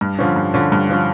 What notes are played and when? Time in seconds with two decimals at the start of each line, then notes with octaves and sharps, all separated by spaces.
0.01 G2
0.19 D3 F3 C#4
0.36 G2
0.54 D3 F3 C#4
0.72 G2
0.89 D3 F3 C#4